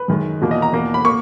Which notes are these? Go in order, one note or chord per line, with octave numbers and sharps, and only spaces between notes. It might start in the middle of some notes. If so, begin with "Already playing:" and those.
Already playing: B4
F#2 D#3 G#3
E2 B2 A#3
D#5
A#5
E2 B2 A#3
B5
A#3 C#6